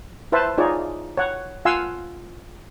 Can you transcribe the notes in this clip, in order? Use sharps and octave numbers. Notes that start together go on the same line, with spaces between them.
E4 B4 C5 E5 A5
D#4 F4 G#4 C#5 D5
C#5 F#5
F4 F5 F#5 G#5 C6 E6